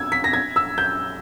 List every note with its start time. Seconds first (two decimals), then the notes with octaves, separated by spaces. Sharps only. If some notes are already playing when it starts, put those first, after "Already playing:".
Already playing: E6 G#6
0.12 B6
0.24 A#6
0.33 G#6
0.56 E6
0.78 G6